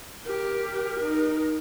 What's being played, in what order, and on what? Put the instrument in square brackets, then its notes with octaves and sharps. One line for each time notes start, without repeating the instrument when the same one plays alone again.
[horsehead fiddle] G4 [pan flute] A#4
[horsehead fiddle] D#4